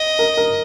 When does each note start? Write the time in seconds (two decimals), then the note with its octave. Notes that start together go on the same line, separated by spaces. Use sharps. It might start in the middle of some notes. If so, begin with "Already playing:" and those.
Already playing: D#5
0.19 A#4
0.37 A#4